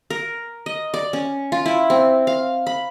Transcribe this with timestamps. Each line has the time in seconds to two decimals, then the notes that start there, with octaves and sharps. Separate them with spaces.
0.10 A#4
0.66 D#5
0.94 D5
1.13 C#4
1.52 F4
1.66 E4
1.90 C4
2.27 F5
2.67 B5